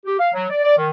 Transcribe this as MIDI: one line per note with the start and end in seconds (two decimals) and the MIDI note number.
0.05 0.18 67
0.20 0.29 77
0.34 0.45 54
0.50 0.61 74
0.64 0.76 74
0.78 0.90 51